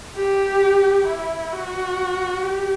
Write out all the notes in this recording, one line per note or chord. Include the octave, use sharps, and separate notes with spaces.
G4
E4
F#4
G4